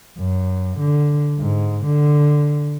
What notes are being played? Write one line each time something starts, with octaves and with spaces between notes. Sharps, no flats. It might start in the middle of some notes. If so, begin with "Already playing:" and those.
F#2
D3
G#2
D3